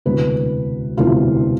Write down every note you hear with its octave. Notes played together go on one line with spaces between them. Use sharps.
E1 D2 C3 E3 B4
E1 D2 C3 E3 F4